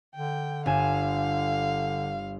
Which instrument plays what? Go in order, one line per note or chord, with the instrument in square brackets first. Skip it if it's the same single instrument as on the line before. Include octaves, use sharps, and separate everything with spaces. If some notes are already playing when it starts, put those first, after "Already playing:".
[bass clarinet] D3 [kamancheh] G5
[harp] G1 G#5 E7 [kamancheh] F5